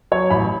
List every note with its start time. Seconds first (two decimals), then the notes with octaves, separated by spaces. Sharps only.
0.12 F#3 C#5
0.30 A1 B5